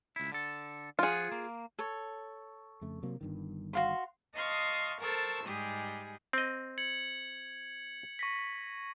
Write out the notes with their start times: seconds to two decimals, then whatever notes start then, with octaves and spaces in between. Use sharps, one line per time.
0.16 C#2 E4
0.32 D3 A4
0.99 F3 F4 G#4 F#5
1.32 A#3
1.79 A4 C#5
2.81 F2 C#3 A3
3.03 C3 F#3 A#3
3.21 G1 G2 D#3
3.73 F#4 F5 C6
4.35 D#5 F5 A5 C6 C#6 D#6
5.01 A4 A#4 C5 A5 C#6 E6
5.44 G#2 G3 G#3 G4 G#4
6.33 C4 D#5
6.78 G#6 C#7 F#7
8.19 C#6 A#6 B6